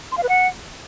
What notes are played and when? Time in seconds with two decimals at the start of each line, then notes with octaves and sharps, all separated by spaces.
0.12 C6
0.18 F5
0.23 B4
0.29 F#5